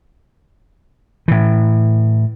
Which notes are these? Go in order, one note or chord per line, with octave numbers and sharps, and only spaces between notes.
A2 E3